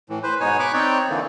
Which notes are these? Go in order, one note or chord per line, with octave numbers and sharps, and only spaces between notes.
A2 E3
B4 C5
G#2 B2 D#4 C#5 G#5
B5 C#6 D6 F#6
C4 D#4 C#5 D5 G5
D3 E3 A#3